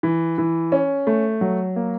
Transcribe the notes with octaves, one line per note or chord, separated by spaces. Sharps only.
E3
E3
C#4
A3
F#3
A#3